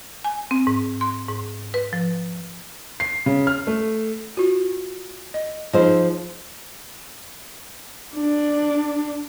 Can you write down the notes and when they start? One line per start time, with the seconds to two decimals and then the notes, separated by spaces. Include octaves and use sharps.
0.24 G#5
0.51 C4
0.67 G#2
1.01 C6
1.29 G#2
1.74 B4
1.93 F3
3.00 C7
3.26 C#3
3.47 F6
3.67 A3
4.37 F4 F#4
5.34 D#5
5.73 F3 D#4 G#4 C5 D#5
8.15 D4